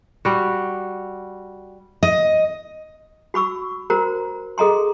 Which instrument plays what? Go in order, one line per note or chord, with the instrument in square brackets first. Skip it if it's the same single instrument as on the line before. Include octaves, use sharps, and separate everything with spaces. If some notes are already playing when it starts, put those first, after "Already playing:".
[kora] G3 F#4
[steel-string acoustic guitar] D#5
[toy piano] F#4 B5 C#6 E6
F#4 A#4 C5 A#5
G#4 A4 D#5 A#5 C6